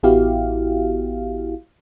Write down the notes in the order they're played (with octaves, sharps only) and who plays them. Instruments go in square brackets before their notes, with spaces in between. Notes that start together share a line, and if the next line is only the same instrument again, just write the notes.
[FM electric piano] A1 B3 E4 F#4 G4 F5